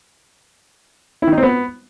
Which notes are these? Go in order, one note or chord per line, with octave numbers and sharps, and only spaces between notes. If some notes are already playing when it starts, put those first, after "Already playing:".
E4
D#3
D#4
C4
B3